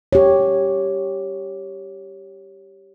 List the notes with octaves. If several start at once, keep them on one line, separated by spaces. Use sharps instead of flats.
G4 C#5